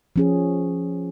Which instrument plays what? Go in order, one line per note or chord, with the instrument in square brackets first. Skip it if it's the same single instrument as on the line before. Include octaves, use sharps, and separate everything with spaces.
[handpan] F3 C#4 G#4